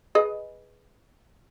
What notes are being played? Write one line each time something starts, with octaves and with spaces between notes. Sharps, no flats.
G#4 B4 D#5